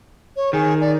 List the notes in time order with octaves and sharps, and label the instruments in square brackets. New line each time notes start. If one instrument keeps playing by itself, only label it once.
[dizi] C#5
[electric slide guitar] D#3 [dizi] G#4
[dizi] D5